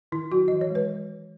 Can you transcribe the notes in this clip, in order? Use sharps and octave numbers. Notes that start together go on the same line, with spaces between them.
D#3 E4
F#3 F#4
E3 D#5
C#5
G#3
B4